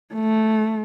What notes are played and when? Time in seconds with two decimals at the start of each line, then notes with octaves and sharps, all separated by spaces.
0.15 A3